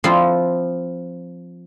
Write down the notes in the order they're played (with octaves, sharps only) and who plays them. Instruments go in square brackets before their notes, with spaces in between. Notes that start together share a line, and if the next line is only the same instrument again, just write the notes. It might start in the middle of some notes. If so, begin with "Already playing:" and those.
[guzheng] F3 C4 E4 F4